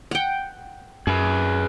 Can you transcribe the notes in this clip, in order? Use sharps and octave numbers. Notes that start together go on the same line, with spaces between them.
F#5 G5
F#2 G#4 B4